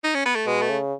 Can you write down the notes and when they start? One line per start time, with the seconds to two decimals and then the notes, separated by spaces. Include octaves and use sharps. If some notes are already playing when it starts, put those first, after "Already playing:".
0.04 D#4
0.15 C#4
0.26 B3
0.35 A3
0.46 B2 G#3
0.62 A3
0.69 C#3